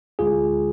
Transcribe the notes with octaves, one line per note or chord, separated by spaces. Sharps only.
D2 D3 G#3 F4 G#4